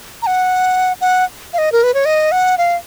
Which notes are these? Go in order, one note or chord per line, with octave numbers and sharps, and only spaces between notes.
A#5
F#5
F#5
F5
D#5
A#4
B4
C#5
D#5
F#5
F5